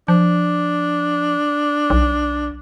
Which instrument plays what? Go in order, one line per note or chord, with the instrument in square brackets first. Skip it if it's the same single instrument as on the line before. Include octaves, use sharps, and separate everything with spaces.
[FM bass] F3 [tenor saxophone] D4
[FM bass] B1